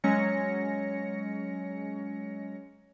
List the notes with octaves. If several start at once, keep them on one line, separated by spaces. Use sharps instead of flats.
F#3 G#3 C#4 C#5 A#6 C#7